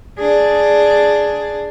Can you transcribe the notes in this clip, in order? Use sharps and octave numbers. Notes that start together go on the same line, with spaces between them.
D4 G#4